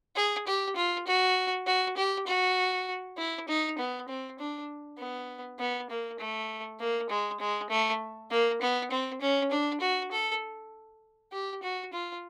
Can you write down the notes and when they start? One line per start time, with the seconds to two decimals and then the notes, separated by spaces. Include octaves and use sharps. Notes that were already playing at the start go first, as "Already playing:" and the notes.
0.16 G#4
0.47 G4
0.76 F4
1.07 F#4
1.67 F#4
1.97 G4
2.27 F#4
3.18 E4
3.48 D#4
3.78 B3
4.08 C4
4.39 D4
4.98 B3
5.59 B3
5.90 A#3
6.19 A3
6.79 A#3
7.10 G#3
7.40 G#3
7.70 A3
8.30 A#3
8.61 B3
8.91 C4
9.21 C#4
9.51 D4
9.81 F#4
10.12 A4
11.32 G4
11.63 F#4
11.93 F4